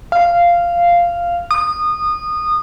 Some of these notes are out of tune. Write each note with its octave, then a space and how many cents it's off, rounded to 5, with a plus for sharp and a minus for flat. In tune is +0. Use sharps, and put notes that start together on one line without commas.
F5 -10
D#6 -25